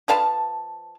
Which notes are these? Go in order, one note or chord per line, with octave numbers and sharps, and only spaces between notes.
F3 B4 F5 A5